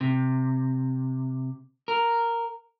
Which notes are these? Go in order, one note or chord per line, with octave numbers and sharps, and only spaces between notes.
C3
A#4